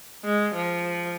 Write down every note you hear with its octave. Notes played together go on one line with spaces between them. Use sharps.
G#3
F3